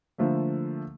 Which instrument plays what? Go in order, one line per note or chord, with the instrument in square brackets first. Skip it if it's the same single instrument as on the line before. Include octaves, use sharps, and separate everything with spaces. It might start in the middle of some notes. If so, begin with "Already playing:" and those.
[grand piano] D3 F3 A3 A#3